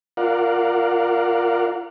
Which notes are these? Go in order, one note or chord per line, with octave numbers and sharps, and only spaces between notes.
F4 A#4 D5 F5 F#5